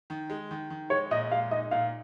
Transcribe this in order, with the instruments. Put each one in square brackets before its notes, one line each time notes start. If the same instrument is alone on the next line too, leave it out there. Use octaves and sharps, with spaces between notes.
[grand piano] D#3
G#3
D#3
D#3
[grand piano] G#3 [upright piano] C#5
[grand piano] A#2 [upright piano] D#5
[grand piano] G#3 [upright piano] F5
[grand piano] D#4 [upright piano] D#5
[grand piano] A#2 [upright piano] F5